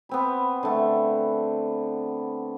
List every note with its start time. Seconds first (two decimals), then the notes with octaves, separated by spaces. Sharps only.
0.09 B3 C4 B5
0.63 D3 A3